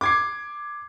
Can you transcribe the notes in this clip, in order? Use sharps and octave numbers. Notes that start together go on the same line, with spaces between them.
D6 G#6 C7